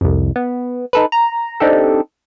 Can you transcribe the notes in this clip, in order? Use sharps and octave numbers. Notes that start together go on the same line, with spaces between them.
C2 F2
B3
D#4 A4 B4
A#5
C4 D4 D#4 G4 A4